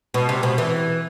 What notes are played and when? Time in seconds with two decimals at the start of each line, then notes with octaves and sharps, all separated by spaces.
0.14 B2
0.29 C3
0.43 B2
0.58 E3